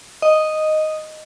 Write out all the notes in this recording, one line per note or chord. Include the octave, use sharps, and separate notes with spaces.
D#5